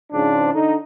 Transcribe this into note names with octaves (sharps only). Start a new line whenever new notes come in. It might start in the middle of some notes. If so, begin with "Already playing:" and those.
G#2 C#3 F3 D4
D3 D#4